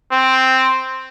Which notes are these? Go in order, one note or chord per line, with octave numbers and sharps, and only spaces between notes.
C4